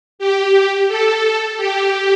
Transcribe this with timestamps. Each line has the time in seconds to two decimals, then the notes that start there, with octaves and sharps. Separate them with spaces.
0.19 G4
0.88 A4
1.58 G4